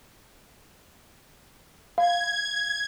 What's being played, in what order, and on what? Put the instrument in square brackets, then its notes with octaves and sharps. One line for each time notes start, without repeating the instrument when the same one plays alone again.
[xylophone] F5 [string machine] G#6